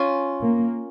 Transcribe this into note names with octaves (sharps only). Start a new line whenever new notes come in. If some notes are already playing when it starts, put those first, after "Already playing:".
Already playing: C#4 F4
A#3